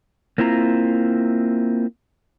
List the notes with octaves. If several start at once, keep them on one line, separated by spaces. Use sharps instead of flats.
A#3 C4 E4 F4 A#5